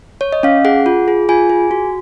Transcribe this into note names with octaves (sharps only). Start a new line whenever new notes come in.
C#5
D#5
C#4 F5
G#4 F#5
F4
G#4
F4 G#5
G#4
F#4